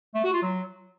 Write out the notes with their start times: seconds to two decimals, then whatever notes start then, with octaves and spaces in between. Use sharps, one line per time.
0.15 A3
0.24 F#4
0.33 F4
0.43 F#3